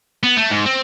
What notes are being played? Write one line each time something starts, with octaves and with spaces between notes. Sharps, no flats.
B3
A3
G#2
C4